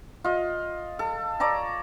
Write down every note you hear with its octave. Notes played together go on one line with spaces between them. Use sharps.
F4 D#5
A4
C#5 D5 A5 A#5